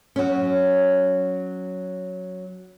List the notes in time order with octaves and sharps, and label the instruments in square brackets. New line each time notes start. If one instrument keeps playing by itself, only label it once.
[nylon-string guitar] F#3 C#4